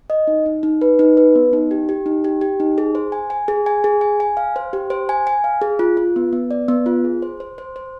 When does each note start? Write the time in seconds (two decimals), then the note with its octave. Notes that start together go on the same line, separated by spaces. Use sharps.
0.10 D#5
0.27 D#4
0.46 D#4
0.63 D#4
0.82 B4
0.99 D#4
1.17 B4
1.35 B3
1.53 D#4
1.71 G4
1.89 G4
2.06 D#4
2.24 G4
2.41 G4
2.60 D#4
2.78 G#4
2.95 C5
3.12 G#5
3.30 G#5
3.48 G#4
3.66 G#5
3.84 G#4
4.01 G#5
4.20 G#5
4.37 F5
4.56 C5
4.73 G4
4.90 C5
5.09 G#5
5.27 G#5
5.44 F5
5.62 G#4
5.79 F4
5.97 F4
6.16 B3
6.33 B3
6.51 D5
6.68 B3
6.86 F4
7.04 G#4
7.22 C5
7.40 C5
7.58 C5
7.76 C5